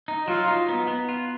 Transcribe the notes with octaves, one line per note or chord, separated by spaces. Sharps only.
D#4
F#3 F4
D#4
B3
B3
F4